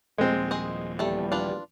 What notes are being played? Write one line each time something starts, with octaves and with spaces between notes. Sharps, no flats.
D#1 A#2 F3 G#3 C4
G#4 C5 D#5
E2 G3 A3 A4
D4 F4 B4